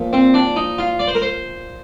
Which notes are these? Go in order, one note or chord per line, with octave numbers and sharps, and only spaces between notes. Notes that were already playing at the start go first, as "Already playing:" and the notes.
Already playing: A#2 F3
C4
D4
D#4
F4
D5
C5
A#4
C5